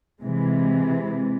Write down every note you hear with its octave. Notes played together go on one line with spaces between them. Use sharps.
C3 E3 G#3